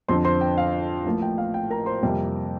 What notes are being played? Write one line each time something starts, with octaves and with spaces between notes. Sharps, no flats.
F2 D3 F3 C5 C6
C5 C6
G5
F5
A1 A2 F3 A#3
G5
F5
G5
A#4 A#5
C5 C6
F2 C3 G3 A#3 G5